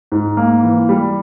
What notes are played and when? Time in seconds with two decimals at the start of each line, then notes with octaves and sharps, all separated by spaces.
0.12 G#2
0.37 A#3
0.64 E3
0.89 G3